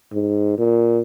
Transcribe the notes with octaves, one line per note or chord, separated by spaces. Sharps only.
G#2
A#2